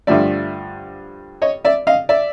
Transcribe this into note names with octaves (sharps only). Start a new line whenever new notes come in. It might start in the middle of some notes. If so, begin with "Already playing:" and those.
G2 D3 F3 A3 D5 E5
C#5 D#5
D5 E5
D#5 F5
D5 E5